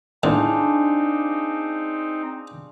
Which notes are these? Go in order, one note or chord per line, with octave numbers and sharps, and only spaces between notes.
A2 D3 C4 D4 D#4 F4 G#4